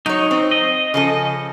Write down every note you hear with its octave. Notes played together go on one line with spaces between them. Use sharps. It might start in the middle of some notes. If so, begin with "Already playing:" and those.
F#3 D#4 C#5
C4
D#5
C#3 F3 A4